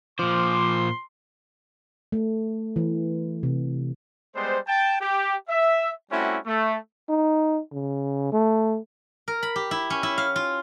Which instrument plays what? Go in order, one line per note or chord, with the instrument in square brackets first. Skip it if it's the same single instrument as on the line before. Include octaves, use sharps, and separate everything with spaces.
[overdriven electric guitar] A#2 C5 [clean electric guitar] F3 [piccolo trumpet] C6 [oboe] D6
[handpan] A3
E3
C3
[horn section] G3 G#3 B3 C5
G5 A5
G4
E5
G3 A3 C4 C#4 E4 F#4
A3
[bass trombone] D#4
C#3
A3
[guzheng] A#4
B5
G4
E4
C#4
E4
F5
F4